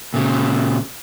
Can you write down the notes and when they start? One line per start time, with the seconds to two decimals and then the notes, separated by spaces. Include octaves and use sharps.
0.14 A#2 C#3